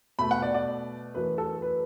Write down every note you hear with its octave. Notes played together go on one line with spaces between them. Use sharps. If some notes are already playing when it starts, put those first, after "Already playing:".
B2 A3 B5
F#5
D5
D5
F#2 E3 A3 B4
A4
B4